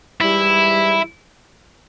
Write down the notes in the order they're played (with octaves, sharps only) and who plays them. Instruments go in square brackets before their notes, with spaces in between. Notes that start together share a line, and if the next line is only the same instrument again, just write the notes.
[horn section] G#2 E3 G3 [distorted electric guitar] E4